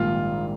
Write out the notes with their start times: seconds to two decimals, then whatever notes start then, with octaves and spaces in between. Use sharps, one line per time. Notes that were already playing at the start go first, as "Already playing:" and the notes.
Already playing: A#1 G#2 D#3 G3 A#3 F4